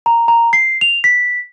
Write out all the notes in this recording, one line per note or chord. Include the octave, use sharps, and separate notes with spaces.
A#5
A#5
C7
F7
B6